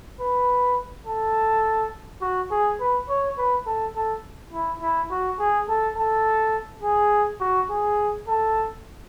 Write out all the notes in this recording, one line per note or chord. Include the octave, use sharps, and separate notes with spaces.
B4
A4
F#4
G#4
B4
C#5
B4
A4
A4
E4
E4
F#4
G#4
A4
A4
G#4
F#4
G#4
A4